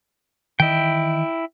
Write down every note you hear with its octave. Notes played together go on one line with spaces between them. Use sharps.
D#3 E3 E4 D#5 G5